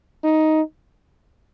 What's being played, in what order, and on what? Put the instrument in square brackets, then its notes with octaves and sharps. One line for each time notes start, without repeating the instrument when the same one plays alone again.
[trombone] D#4